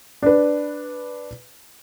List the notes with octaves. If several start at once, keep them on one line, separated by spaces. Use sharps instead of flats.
D4 B4